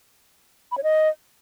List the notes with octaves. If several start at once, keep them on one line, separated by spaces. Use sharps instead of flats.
B5
C#5
D#5